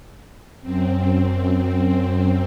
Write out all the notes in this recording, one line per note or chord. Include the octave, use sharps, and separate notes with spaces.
F#2 C4